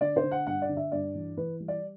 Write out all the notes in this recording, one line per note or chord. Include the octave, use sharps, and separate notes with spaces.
D3 D5
C5
D3
F#5
G2 F#5
D5
D3
E5
G2 D5
E3
E3 B4
G3
D5